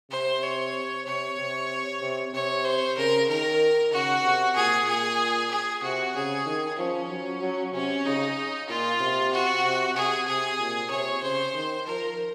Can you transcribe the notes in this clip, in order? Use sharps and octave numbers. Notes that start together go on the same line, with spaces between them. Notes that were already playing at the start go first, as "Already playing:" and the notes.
C3 C5
C#5
C3 C#5
C3
C3
C3 C#5
C5
C#3 A#4
D#3 A#4
C#3 F#4
C3
A#2 G#4
A#2 G#4
G#4
C3 F#4
C#3 G#4
D#3
F3 C#4
F#3
F#3
C3 C#4
C#3 D#4
A#2 F4
C3
F#4
C3
C3 G#4
C3 G#4
A#2
C3 C#5
C#3 C5
D#3
F3 A#4